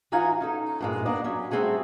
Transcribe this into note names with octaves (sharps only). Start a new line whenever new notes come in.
E3 D#4 F4 F#4 G#5 A#5
C#4 D#4 A4
G2 A#2 G#3
A#3 B3 D4 D#5
F#3 C#4
G3 A3 C4 F#4 G#4 A4